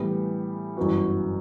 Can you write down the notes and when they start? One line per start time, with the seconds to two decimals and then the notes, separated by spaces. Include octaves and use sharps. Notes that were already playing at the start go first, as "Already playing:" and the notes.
Already playing: A2 E3 G3 B3
0.77 G1 F#2 E3 B3 F#4